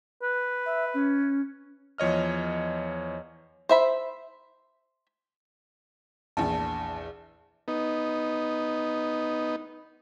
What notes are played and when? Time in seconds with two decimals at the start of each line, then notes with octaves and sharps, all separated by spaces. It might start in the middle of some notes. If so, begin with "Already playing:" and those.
0.22 B4
0.66 E5
0.94 C#4
1.98 E2 F3 C#5 D#5 F6
3.69 C5 E5 B5
6.37 A#1 E2 A5
7.68 B3 D#4